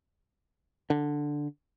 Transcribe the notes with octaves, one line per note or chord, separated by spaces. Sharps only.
D3